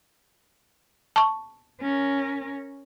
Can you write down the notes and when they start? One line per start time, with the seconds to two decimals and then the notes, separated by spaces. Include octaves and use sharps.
1.16 A5 C#6
1.80 C#4 A#4